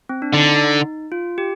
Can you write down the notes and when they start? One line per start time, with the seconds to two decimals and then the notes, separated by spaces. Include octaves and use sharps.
0.09 C4
0.22 D4
0.34 D3 D#4
1.12 F4
1.38 G4